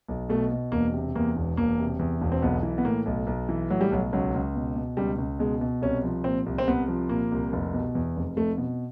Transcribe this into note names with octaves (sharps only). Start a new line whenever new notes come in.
B1
B2 A3
B2
E1 A#3
C3
E2 A#3
E1
E1 A#3
C3
E2
E1
C4
B1 B3
E3
B3
A2 A#3
B1
B1
E3
A2 F#3
G3
B1 F#3
C#2 F#3
C#2
B2
B2
C#2 G3
C#2
B2 G#3
B2
C2 C#4
F3
A#2 C4
C2
C4
C2 B3
F3
A#2 A#3
C2
F1
B2
E2
F1
F1 A3
B2